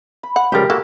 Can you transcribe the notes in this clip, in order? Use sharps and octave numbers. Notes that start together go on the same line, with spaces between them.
B5
F#5
C#2 F3 G3 G4 A#4
A#3 E4 F#4 A4 F5